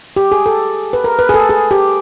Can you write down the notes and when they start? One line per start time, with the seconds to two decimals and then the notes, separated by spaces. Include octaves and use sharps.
0.16 G4
0.32 G#4
0.46 A4
0.93 B4
1.04 A#4
1.19 B4
1.29 G#4
1.34 A4
1.49 G#4
1.71 G4